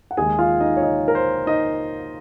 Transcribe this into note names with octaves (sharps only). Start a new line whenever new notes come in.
F#5
D#2 D#3 G#3 G#4 G#5
F4 F5
D#4 D#5
C#5
D#4 D#5
A#4
C5
D#4 D#5